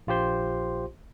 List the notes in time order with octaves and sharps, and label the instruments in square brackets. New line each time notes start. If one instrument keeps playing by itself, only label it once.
[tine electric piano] A#1 F4 G4 C5 C6